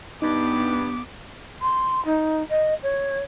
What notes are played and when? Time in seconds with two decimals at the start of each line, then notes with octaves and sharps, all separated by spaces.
0.22 G2 B3 D#4 D6
1.62 C6
2.05 D#4
2.49 D#5
2.83 C#5